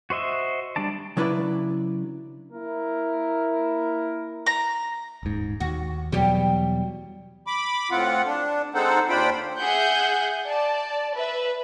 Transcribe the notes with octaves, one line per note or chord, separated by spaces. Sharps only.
F#4 C5 D#5 E5
G3 D4 D5 A5
C#3 F#3 D4 E4 B4 D5
A#3 E4 A#4
A#5
D#1 G#2
D#2 F#4
E2 B2 F#3 G3 G4
B5 D6
A2 C4 F4 F#5
D4
G#3 C4 D#4 A4 C5 F#5
D#2 D4 F4 C5 G5 B5
G#4 E5 F#5 F#6 G6
D5 A5
B4 E5